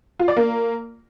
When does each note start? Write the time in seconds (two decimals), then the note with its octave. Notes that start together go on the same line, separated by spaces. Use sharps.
0.19 F4
0.28 D5
0.37 A#3